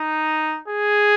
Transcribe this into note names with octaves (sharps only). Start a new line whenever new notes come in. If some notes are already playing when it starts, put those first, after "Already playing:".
Already playing: D#4
G#4